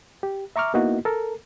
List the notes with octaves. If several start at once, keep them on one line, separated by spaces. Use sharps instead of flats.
G4
E5 A#5 C#6 D6 F6
A#3 B3 D#4 E4 F#4
A4 A#4